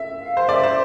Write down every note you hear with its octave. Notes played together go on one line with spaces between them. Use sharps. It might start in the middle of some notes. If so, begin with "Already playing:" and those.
Already playing: E5
F5
C5
D5 E5
C5